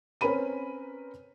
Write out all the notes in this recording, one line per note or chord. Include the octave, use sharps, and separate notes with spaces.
C4 C#4 A#4 B4 B5 D#7